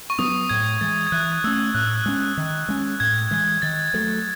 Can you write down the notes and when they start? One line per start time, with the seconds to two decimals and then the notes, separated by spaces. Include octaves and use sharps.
0.10 C#6
0.19 F#3 B3 D#6
0.49 A2 G#6
0.81 E3 G#3 A6
1.07 G#6
1.12 E3 F#6
1.44 A3 C#4 E6
1.74 A2 F#6
1.86 E6
1.96 F#6
2.06 G#3 C#4
2.38 D#3
2.69 G#3 C#4
3.00 A2 G#6
3.31 E3 G#3
3.62 D#3 A6
3.94 F#3 A3